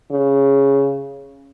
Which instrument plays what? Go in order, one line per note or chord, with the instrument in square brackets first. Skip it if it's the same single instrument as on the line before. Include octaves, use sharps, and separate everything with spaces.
[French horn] C#3